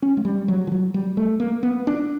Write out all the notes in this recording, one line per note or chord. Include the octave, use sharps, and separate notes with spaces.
C#4
G#3
G3
F#3
F3
F#3
G3
A3
A#3
B3
D4